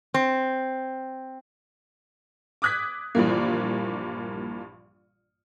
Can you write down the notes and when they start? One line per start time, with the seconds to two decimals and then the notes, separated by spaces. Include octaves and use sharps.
0.14 C4
2.62 D6 D#6 F#6 G#6 B6
3.15 A#1 G2 A#2 E3 A#3